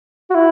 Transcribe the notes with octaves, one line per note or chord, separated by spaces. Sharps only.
F#4
E4